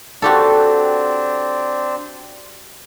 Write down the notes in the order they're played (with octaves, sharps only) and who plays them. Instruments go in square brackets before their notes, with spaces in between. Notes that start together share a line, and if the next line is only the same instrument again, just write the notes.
[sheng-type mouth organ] C4 D4 [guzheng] F#4 G4 A4